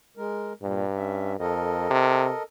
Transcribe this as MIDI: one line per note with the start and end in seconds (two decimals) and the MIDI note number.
0.17 0.53 56
0.17 0.53 70
0.62 1.38 43
0.62 0.85 46
0.62 0.85 55
0.97 1.33 61
0.97 1.33 76
1.40 1.86 41
1.40 2.43 69
1.40 2.43 70
1.40 2.43 75
1.90 2.31 48